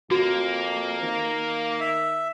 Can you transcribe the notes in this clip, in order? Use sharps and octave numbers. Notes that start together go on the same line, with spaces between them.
F2 A#3 F#4
D#3
E5